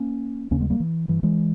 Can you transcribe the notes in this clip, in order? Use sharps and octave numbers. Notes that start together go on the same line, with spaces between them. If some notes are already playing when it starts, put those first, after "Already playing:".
Already playing: A#3 C#4
D#2 C#3 A#3 C#4
G#3 B3
G3 A#3
E3
G2 E3
E3 G#3